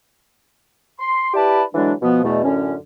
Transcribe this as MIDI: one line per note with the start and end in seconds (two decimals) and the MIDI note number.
0.99 1.29 84
1.34 1.63 64
1.34 1.63 67
1.34 1.63 71
1.34 1.63 74
1.34 1.63 81
1.34 1.63 83
1.74 1.93 50
1.74 1.93 52
1.74 1.93 54
1.74 1.93 56
1.74 1.93 62
2.01 2.21 47
2.01 2.21 53
2.01 2.21 59
2.23 2.41 40
2.23 2.41 47
2.23 2.41 57
2.44 2.74 42
2.44 2.74 45
2.44 2.74 50
2.44 2.74 61